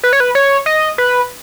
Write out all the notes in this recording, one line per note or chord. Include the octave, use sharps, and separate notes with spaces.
B4
C#5
B4
C#5
D#5
B4